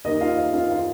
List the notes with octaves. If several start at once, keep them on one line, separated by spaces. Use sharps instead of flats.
D#2 D#3 D#5
F4 F5
D#5
F4 F5
F4 F5